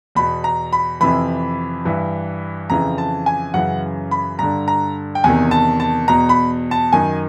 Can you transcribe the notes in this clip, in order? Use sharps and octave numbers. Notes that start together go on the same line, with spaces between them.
E2 B2 B5
A#5
B5
F2 C3 E3 B5
G2 E3
F2 C#3 E3 A#5
A5
G#5
F#2 C#3 E3 F#5
B5
G2 D3 A#5
A#5
G5
E2 C3 D#3 G#5
A5
A5
E2 B2 A#5
B5
A5
F#2 D#3 G#5